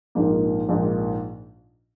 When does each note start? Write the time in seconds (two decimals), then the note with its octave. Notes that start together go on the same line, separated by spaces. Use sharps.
0.15 A#1 G#2 F3 A#3 D#4
0.69 A#1 G#2 F3 A#3 D#4